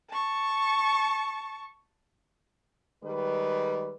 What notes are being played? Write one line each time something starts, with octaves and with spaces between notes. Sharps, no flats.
A5 C#6
D#3 G3 G#3 B4